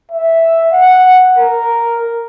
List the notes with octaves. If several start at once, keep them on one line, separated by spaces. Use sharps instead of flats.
E5
F#5
A#4